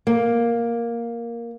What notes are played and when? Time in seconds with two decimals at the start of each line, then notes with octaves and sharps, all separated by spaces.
0.07 A#3